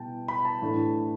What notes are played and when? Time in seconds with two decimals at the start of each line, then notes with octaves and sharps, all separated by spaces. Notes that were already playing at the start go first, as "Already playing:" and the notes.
Already playing: B2 G3 E4 G5 A5
0.28 B5
0.45 A5
0.61 A2 E3 A3 D4